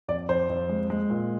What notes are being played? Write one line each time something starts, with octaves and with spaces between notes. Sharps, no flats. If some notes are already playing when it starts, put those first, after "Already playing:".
F2 D5
F2 C5
F2
G#3
G#3
A#2